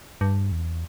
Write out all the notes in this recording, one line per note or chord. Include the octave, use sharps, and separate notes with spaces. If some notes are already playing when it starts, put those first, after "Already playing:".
G2
E2